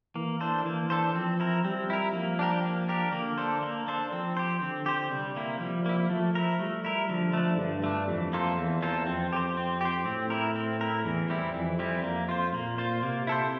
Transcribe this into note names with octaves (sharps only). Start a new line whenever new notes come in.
E3 A#3
D4 A4 C5
E3 A#3
D4 A4 C5
F3 C4
E4 A#4
G3 C4
E4 A#4
F3 A#3
D4 G4 A#4
A#3
D4 G4 A#4
D3 A#3
D4 A4 C5
A#3
D4 A4 C5
F3 C4
G4 C5
D3 C4
G4 C5
C3 G3
A#3 E4
F3 G3
A#3 E4
F3 A3
E4 A#4
G3 A3
E4 A#4
D3 F3
A3 D4
G2 D3
A3 D4
F2 E3
A#3 F4 A4 C5
E2 E3
A#3 F4 A4 C5
F2 C4
G4 C5
C4
G4 C5
A2 C4
E4 A#4
C4
E4 A#4
E2 E3
G3 C4 E4
F2 E3
G3 C4 E4
F2 A#3
F4 C5
A#2 A#3
F4 C5
C3 A#3
E4 A4 C5